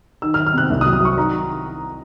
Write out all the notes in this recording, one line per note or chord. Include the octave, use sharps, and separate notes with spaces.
D#3 E6
F6
D#3
F6
C3 F#6
C2
D#6
F#3
D#6
F#3 C#6
D#3 A#5